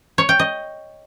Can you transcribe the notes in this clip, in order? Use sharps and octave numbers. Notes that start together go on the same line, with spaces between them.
C#5
G5
D#5